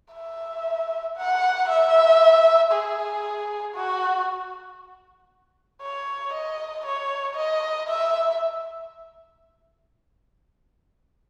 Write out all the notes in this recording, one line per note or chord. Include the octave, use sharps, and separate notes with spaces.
E5
F#5
E5
G#4
F#4
C#5
D#5
C#5
D#5
E5